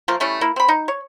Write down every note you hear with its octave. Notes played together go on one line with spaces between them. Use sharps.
F3 A3 A#3 F4
G3 A3 C#4 E4
A#3 E4
C4 B5
D#4
C#5